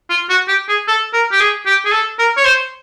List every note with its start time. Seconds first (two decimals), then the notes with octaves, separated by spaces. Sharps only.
0.10 F4
0.30 F#4
0.48 G4
0.69 G#4
0.88 A4
1.13 A#4
1.32 G4
1.40 G#4
1.66 G4
1.86 G#4
1.92 A4
2.19 A#4
2.37 C#5
2.45 C5